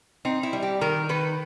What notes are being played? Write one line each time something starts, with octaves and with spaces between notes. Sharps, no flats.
C4 D#4
E4
G3
G4
D#3 A#4
D#3 B4